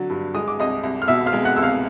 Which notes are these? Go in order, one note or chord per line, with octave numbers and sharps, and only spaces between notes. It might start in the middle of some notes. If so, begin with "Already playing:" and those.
Already playing: D3 F#3
G2
G#3 D#6
D6
C2 D#5 D#6
C2
F6
B2 E5 E6
F5 F6
G#3
F#5 F#6
C2 E6
F5 F6